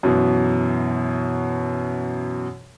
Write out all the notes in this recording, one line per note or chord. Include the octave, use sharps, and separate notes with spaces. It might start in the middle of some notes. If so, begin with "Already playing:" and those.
F#2 B2 E3